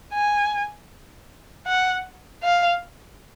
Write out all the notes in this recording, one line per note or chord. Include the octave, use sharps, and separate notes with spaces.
G#5
F#5
F5